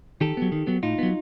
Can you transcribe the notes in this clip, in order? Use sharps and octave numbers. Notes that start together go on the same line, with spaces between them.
D#3 G4 A4
F#3 B3
D#3
F#3 B3
A2 D#4 F4
F#3 B3